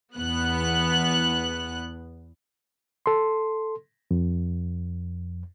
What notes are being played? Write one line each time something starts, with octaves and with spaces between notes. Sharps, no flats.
E2 B3 F#6
A4 C6
F2